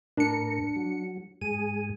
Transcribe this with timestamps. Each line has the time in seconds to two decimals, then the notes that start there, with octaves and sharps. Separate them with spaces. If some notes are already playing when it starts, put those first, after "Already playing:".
0.17 A2 D4 A#4 C#7
0.76 F#3
1.41 G#2 G#4 D#7